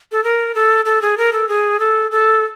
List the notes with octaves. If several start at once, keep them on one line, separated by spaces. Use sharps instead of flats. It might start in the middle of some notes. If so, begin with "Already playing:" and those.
A4
A#4
A4
A4
G#4
A#4
A4
G#4
A4
A4